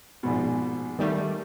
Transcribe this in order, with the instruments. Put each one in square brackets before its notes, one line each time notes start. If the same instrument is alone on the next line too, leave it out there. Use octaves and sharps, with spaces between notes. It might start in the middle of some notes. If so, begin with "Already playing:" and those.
[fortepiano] A#1 G#2 B2
[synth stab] D#3 G3 A3